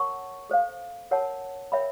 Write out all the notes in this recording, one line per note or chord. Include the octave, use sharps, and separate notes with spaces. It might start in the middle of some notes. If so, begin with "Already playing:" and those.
Already playing: A#4 C#5 F#5 A5 C#6
A4 C5 F5
A#4 C#5 F#5 A5
A#4 C#5 E5 G5 B5